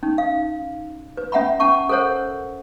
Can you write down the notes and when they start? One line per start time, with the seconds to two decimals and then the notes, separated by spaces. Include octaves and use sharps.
0.03 C#4 D#4
0.18 F5
1.17 B4
1.32 C#4 E5 F#5 A#5 B5
1.60 C#4 F#5 A5 C#6
1.89 A4 A#4 C5 C#5 F#5